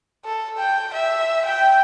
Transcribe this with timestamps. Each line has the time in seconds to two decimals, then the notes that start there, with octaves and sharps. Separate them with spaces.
0.25 A4
0.58 G5
0.93 E5
1.46 G5